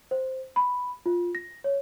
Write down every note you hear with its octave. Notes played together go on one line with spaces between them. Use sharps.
C5
B5
F4
A#6
C#5